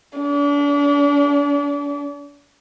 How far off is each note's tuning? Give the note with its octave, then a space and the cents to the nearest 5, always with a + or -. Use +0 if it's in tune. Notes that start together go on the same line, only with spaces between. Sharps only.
D4 -40